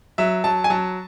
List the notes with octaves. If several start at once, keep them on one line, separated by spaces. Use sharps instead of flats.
F#3 E5
F#3 A5
G#5
F#3 A5